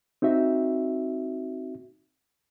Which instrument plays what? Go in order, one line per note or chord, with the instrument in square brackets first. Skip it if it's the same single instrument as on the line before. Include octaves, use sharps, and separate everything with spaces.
[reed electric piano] C4 D#4 F#4 E5